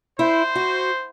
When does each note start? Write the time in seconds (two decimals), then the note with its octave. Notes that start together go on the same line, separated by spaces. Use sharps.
0.19 E4 C5
0.55 F#4